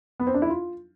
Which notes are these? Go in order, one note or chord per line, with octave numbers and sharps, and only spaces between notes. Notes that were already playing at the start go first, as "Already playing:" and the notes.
B3
C4
D4
E4
F4